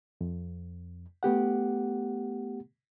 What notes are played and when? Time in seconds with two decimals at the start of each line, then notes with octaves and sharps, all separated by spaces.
0.21 F2
1.23 A3 B3 G4 F#5